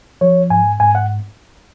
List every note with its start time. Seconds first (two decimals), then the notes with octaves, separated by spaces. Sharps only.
0.21 F3 C#5
0.50 G#2 G#5
0.80 G#2 G#5
0.95 F#5